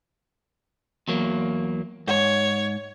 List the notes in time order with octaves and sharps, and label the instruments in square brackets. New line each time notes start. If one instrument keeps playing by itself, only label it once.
[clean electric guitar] E2 F#3 A#3
[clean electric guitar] G#2 [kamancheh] C#5